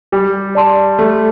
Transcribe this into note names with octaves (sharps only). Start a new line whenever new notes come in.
G3 G4
D5 A5 C6
A3 G4